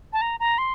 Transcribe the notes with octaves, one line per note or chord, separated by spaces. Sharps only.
A5
A#5
A#5
C6